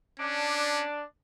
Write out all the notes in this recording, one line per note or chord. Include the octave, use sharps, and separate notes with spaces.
C#4 D4